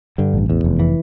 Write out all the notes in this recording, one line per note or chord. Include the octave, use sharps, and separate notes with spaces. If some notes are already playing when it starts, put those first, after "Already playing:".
G2 D3
A1
E2
F1
E3